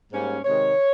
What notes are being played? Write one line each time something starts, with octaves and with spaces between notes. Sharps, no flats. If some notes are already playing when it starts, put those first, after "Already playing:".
G#2 G3 A#3 C#4
C3 D#3 G#3 C#5